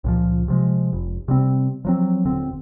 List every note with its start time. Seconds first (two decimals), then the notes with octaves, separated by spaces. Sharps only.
0.04 C#2 A#2 F3
0.48 C3 F3 G#3
0.93 F1
1.28 C3 G3 C4
1.85 F3 F#3 C4
2.25 D#1 D3 C4